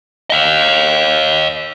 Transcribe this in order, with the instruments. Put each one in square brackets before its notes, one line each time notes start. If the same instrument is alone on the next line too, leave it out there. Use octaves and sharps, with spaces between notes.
[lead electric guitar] D#5 F5